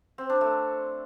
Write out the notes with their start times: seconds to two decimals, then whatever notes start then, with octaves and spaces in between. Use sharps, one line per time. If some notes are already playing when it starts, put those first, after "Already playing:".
0.18 C4
0.30 D4
0.41 A3